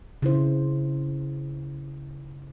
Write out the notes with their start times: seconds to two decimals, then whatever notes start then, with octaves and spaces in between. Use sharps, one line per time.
0.22 C#3 E4 C5